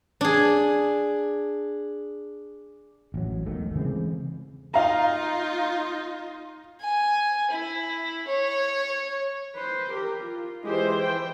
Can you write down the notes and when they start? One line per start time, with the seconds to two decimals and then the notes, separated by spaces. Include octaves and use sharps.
0.21 D4 G#4
3.14 A1 F#3
3.46 E1 B1 D#3 A3
3.75 C#3 E3 G#3 C4
4.74 D#4 F4 F5 A#5
6.81 G#5
7.51 E4
8.28 C#5
9.55 B4 C5
9.92 G4 A#4
10.22 F4
10.64 E3 G#3 G4 C5
11.01 G5